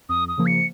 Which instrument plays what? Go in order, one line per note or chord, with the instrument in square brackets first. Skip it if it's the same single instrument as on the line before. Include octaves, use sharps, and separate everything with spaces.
[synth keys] F2 [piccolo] D#6
[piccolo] D#6
[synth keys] C#3 F3 A#3
[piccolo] C#7